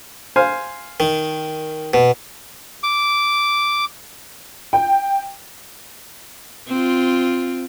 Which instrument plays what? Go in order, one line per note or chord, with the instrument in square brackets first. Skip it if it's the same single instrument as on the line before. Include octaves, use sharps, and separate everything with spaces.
[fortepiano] C5 F5 G#5
[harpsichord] D#3
B2
[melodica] D6
[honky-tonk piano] G5
[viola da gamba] C4 F4